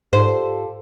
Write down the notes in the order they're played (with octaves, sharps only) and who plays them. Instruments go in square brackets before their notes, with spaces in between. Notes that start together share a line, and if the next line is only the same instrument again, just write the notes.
[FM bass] G#2 [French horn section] F4 G4 A4 [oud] C5